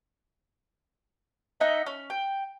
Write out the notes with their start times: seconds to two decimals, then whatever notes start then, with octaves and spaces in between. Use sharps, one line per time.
1.60 D#4 D#5 E5 F#5
1.86 C#4
2.10 G5